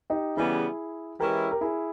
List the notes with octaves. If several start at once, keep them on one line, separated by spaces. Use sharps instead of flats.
D#4 G4
C#3 E3 G3 B3 E4 G#4
E3 G#3 C#4 E4 G4 A#4
A#4
E4 G#4